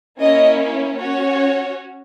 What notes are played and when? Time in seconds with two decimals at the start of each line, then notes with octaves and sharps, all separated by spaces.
0.21 A#3 C#4 E4 D#5
1.00 C#4 F#4 C#5